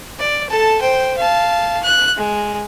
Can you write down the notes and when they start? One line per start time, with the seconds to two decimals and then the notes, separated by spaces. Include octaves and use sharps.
0.19 D5
0.49 A4 A5
0.81 C5 G5
1.18 F5 A5
1.83 F#6
2.17 G#3